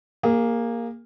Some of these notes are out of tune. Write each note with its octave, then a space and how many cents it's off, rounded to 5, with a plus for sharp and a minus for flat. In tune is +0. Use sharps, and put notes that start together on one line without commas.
A#3 +0 G#4 -30